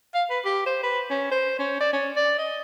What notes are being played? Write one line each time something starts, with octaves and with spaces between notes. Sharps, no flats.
F5
B4
G4
C5
B4
C#4
C5
C#4
D5
C#4
D5
D#5